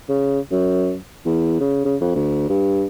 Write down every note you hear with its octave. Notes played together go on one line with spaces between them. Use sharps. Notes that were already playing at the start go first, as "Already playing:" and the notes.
C#3
F#2
E2
C#3
C#3
F2
D2
G2